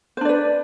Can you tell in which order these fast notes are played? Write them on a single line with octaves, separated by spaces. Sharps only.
C5 D4 D5 B4